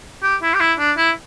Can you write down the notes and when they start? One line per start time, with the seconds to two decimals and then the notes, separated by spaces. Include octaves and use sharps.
0.23 G4
0.42 E4
0.54 G4
0.60 E4
0.79 D4
0.97 E4